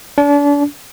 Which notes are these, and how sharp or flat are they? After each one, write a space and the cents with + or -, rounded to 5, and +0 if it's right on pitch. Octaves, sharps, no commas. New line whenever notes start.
D4 -35